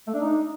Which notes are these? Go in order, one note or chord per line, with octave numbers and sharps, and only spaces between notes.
A3
D4
D#4